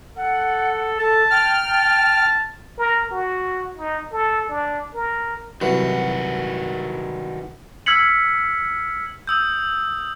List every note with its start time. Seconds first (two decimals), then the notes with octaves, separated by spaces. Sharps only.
0.17 A4 F#5
0.99 A4 A5
1.31 G5 F6
1.67 A5
2.78 A#4
3.11 F#4
3.78 D#4
4.12 A4
4.49 D4
4.95 A#4
5.61 C2 D#3 E3 F#3 F#4
7.86 E6 F6 G#6 B6 C#7 F#7
9.27 D#6 E6 G6